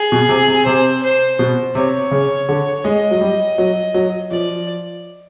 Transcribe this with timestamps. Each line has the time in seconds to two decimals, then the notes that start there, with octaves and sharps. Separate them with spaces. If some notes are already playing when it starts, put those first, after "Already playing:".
Already playing: G#4
0.12 B2
0.29 C3
0.48 C3
0.66 C3 C5
1.03 C5
1.39 B2
1.75 C3 C#5
2.11 C#3
2.49 D3
2.84 G#3 D#5
3.11 F#3
3.21 G3
3.58 F#3
3.94 F#3
4.31 F3 D5